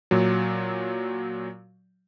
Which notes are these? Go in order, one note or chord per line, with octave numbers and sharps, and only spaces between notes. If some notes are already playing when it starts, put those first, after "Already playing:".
A#2 F#3